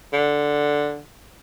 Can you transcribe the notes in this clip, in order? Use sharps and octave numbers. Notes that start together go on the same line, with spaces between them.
D3